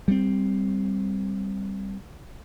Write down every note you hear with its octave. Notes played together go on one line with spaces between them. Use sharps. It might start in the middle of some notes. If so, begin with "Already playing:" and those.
G3 G#3 C4